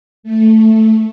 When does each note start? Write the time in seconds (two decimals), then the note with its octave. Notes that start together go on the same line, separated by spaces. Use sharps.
0.23 A3